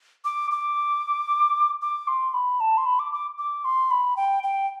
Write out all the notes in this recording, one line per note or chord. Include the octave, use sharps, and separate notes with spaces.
D6
D6
D6
C6
B5
A5
C6
B5
D6
D6
D6
C6
B5
G5
G5